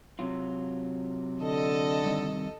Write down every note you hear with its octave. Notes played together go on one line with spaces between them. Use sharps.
C3 F#3 F4
D3 A4 D#5
G2 C3 D#3